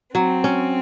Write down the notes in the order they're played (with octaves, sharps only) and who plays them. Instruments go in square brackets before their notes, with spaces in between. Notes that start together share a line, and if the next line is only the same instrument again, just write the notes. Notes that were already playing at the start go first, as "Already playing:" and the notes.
[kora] F#3 [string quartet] C4
[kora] C#4